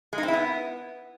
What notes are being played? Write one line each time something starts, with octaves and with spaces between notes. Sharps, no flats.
G#3
D#4
C4
E4
B3